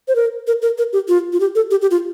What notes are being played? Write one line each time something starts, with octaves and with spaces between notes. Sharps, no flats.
C5
A#4
A#4
A#4
A#4
G4
F4
F4
G4
A4
G4
G4
F4